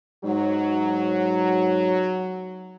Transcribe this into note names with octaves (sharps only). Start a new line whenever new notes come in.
G#2 F#3